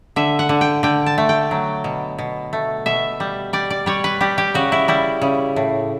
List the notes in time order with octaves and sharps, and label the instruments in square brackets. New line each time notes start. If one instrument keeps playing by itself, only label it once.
[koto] D3 E5
F#5
D3
G5
D3 G5
A5
A3
G5
F#3
B2
B2
A3
B2 E5
G3
G3 D5
D5
G3 C#5
B4
G3 G4
G4
C#3 F#4
E4
G3 E4
C#3
A2